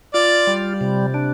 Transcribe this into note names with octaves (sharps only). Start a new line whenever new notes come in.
F4 D5
G3
C3
D4